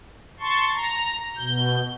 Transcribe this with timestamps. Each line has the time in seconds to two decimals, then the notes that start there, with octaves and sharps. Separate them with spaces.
0.40 A5 C6 C#6
0.75 A#5
1.36 B2 G6